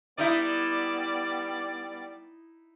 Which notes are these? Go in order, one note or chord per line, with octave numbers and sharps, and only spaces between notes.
G3 B3 D#4 E4 D5